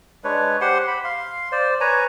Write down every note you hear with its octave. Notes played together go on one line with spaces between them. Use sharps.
G#3 D4 B4 C#5
G4 C5 F#5 C6
B5
F5 C6
C5 D5
B4 C#5 G#5 A#5